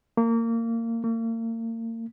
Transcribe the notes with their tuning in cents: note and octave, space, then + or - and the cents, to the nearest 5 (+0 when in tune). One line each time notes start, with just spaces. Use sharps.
A#3 -25
A#3 -40